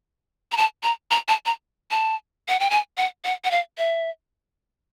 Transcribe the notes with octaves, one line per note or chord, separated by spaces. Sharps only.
A#5
A5
A#5
A#5
A5
A#5
A5
F#5
G5
G#5
F#5
F#5
F#5
F5
E5